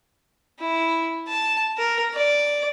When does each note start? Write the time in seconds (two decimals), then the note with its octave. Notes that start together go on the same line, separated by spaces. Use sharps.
0.59 E4
1.28 A5
1.77 A#4
2.14 D5